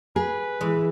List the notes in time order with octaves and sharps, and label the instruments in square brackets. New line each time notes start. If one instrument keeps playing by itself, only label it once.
[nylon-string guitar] G#4 [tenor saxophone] B4
[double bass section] E3 [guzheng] G#3